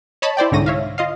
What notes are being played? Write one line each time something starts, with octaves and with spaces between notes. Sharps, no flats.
C#5 D#5 A5 B5
E4 C5 D5 G5
C2 G#2 D3 C#5 A#6 D#7
C#5 E5 F5
F4 D#5 F5